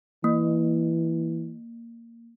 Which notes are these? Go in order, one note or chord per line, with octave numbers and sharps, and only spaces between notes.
E3 A#3